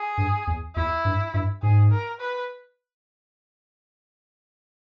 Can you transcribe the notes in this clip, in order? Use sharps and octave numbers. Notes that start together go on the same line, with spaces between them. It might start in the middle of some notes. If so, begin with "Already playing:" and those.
Already playing: G#4
G2
E2
E2 E4
G2
G2
G#2 G#4
A#4
B4